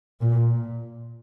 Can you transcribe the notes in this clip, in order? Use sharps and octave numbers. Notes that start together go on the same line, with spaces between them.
A#2